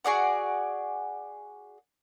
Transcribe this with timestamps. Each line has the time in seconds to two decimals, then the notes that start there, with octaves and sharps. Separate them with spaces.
0.05 F#4 G#4 D5 F#5